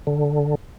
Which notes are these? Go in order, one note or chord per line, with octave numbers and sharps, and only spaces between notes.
D3